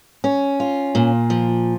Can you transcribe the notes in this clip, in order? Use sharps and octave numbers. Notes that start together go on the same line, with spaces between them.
C#4
F4
A#2
F3